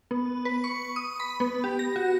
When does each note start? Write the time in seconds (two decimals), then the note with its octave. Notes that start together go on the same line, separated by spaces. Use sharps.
0.11 B3
0.45 B4
0.64 C#6
0.96 D#6
1.20 B5
1.40 B3
1.64 G4
1.79 A#6
1.96 F#4